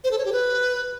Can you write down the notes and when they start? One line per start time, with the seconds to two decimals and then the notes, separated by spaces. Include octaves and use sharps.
0.04 C5
0.11 A4
0.18 C#5
0.25 G4
0.32 B4